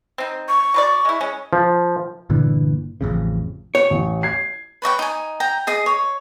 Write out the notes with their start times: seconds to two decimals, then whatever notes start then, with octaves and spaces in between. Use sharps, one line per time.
0.18 C4 D#4
0.48 C#6
0.74 F#3 B4 D5
1.05 G#3 E4
1.21 G#3 C#4
1.53 F3
2.30 G1 A#2 D3 E3
3.01 A1 F2 C#3
3.75 C#5
3.90 A1
4.23 G#6 C7
4.82 B4 C#5 D#5 G5
4.99 D#4 G#5
5.40 G5 A#5
5.67 G#4 D#5 D#6
5.86 C#5